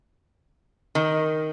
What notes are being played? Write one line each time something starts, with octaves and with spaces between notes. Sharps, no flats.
D#3